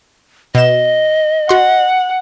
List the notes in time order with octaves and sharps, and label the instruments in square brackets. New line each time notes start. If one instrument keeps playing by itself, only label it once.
[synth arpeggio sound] B2 E7 [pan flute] D#5
[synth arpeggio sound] F#4 C6 [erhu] F#5